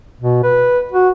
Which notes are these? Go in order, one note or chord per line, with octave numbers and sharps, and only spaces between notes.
B2
B4
F#4